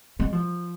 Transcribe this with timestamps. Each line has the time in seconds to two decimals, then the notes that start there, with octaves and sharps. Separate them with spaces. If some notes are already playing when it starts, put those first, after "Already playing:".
0.20 G#3
0.33 F3